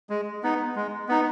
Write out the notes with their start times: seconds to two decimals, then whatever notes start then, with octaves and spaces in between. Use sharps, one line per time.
0.10 G#3
0.43 B3 D#4
0.76 G#3
1.09 B3 D#4